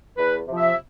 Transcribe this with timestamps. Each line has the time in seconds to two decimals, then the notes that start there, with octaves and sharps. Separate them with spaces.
0.17 E2 B4
0.48 C3 F3
0.58 E5